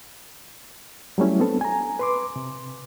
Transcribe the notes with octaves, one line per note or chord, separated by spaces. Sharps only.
F#3 G3 A3 C#4 E4
B3 C4 D4 A4
G#5 A#5
B4 C6 D6
C3